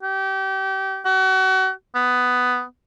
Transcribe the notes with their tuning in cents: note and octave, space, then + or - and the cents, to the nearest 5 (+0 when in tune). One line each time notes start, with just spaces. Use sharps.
G4 -30
F#4 +35
B3 +10